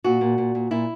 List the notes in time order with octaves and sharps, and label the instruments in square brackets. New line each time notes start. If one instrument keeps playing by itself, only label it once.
[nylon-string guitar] A#2 F#4
A#2
A#2
A#2
A#2 E4